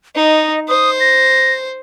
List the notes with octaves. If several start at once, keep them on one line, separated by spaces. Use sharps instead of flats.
D#4 D#5
C5 D#6
A#6